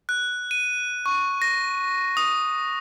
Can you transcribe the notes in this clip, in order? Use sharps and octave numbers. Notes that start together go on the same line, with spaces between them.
F#6
D#7
C#6
A#6
D#6